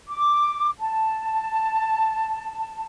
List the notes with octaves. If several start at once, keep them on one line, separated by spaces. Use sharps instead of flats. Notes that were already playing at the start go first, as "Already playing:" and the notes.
D6
A5